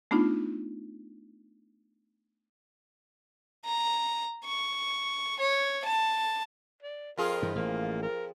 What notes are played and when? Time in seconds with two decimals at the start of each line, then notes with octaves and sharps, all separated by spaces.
0.11 A3 B3 D4 D#4 F4
3.65 A#5
4.45 C#6
5.40 C#5
5.85 A5
6.83 D5
7.17 F2 F4 G#4 A#4
7.42 G2 E3
7.56 A1 A#3
8.02 A#4